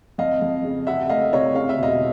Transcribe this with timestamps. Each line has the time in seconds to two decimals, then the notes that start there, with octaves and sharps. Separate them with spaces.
0.18 F2 D#5 F5
0.42 F2
0.64 C#3
0.87 C3 E5 F#5
1.09 A3 D#5 F5
1.33 C3 C#5 D#5
1.55 C#3 F5
1.69 E5
1.78 E1 D#5 F5